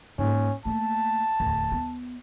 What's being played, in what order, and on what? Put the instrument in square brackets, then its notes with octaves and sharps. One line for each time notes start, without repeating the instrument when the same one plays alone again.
[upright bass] G#2 A#3 [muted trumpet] C#4
[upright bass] A3 A#3 [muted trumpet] A5
[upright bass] D1 E2
B3